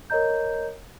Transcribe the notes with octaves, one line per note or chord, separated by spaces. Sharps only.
A#4 C#5 D#5 A#5 G6